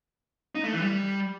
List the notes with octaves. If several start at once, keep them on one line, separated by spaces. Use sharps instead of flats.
D#4
A3
E3
G3